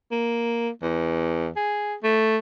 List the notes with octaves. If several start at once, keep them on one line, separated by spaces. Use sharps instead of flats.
A#3
E2
G#4
A3